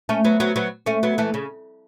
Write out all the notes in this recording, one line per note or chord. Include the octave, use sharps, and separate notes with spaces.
A3 C#4
F#3 B3
F#3 B3
F#3 B3
A3 C#4
F#3 B3
E3 A3
C#3